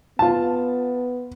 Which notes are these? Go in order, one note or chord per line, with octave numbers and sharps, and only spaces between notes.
B3 F4 A5